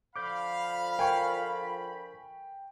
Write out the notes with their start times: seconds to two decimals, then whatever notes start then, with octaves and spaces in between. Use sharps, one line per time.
0.16 D3 F3 F5 B5 D6 G6
0.99 A#4 G5 G#5 C#6